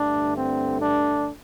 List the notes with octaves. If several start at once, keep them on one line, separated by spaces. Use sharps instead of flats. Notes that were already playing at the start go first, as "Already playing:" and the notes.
Already playing: G2 D3 A3 D4
C4
D4